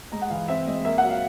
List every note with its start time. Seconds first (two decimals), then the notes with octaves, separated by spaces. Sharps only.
0.12 G#3 A#5
0.22 F#5
0.30 E3 F5
0.48 C4 E5
0.66 G#3 D#5
0.85 A#3 E5
0.98 F#5
1.03 F#3
1.10 F5